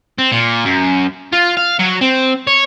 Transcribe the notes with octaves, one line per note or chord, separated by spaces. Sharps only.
C4
A#2
F#2
F4
F5
F#3
C4
C#5